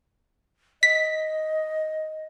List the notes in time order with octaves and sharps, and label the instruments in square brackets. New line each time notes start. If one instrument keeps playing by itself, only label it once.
[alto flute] D#5 [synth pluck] B6